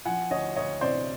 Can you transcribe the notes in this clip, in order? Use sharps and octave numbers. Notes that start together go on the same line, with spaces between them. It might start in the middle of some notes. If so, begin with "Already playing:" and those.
F3 F#5 G#5
D2 C#5 D#5
D2 C#5 D#5
C3 C5 D5